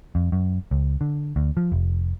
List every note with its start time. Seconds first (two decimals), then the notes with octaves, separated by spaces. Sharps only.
0.15 F2
0.32 F#2
0.71 C#2
1.01 D3
1.36 D2
1.57 F3
1.72 F1